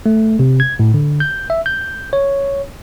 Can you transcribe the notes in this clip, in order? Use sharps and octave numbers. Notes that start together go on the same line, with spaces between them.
A3
C3
G#6
A2
D3
G6
E5
G6
C#5